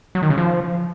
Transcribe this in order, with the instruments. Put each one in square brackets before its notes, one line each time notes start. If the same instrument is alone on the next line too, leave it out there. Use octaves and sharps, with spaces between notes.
[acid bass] F#3
D#3
C#3
F3